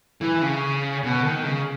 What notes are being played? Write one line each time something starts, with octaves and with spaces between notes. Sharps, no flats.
E3
C#3
B2
D#3
C#3